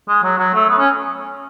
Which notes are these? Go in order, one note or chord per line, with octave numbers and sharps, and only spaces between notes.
G#3
F#3
F#3
A3
B3
C#4